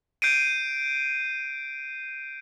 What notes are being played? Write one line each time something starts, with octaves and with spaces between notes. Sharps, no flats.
G6 C7 D7 D#7